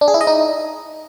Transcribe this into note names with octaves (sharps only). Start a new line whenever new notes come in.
D4
G#4
E4
D#5
D#4